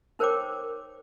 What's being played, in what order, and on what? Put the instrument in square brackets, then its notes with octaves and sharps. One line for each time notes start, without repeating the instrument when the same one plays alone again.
[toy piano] D#4 A#4 C5 C#5 G5 D6